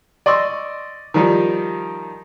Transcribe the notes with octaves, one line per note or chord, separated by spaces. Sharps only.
D5 D#5 C6 C#6 E6
D#3 F3 G3 D#4